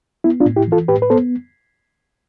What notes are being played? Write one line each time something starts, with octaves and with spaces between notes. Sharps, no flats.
B3 E4
D4 F4
A2
E4 G4
E3 F4 A4
A2 G4 B4
B4
B3 A4 C5